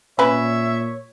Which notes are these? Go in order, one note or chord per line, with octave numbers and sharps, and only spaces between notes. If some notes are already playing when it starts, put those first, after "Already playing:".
A#2 C#4 B4 C#5 E5